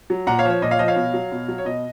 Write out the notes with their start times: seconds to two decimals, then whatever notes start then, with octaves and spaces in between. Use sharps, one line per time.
0.10 F#3
0.27 A#2 F#5 A#5
0.39 C#5 F5
0.45 F3
0.51 C#5
0.62 A#2 D#5
0.71 C#5 F5
0.79 F3 D#5
0.88 C#5 F5
0.96 B2
1.14 F#3
1.32 B2
1.48 F#3
1.58 C#5
1.65 B2 D#5